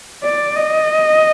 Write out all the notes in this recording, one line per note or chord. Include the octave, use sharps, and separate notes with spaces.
D5
D#5